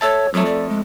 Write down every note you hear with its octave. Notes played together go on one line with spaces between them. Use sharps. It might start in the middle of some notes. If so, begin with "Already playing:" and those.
A4 C#5 E5 A5
F2 F#3 A3
D5
G#3